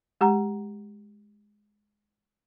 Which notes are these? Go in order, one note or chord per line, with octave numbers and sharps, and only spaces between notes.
G#3 G4 F#5 A#5